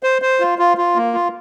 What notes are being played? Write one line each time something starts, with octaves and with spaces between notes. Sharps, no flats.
C5
C5
F4
F4
F4
A#3
F4